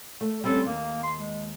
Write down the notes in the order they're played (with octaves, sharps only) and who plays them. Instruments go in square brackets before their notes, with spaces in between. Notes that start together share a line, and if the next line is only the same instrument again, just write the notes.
[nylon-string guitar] A3
[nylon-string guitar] G3 C4 C#4 [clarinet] A4
[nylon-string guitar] D#2 [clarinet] A#3
[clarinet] C6
G#3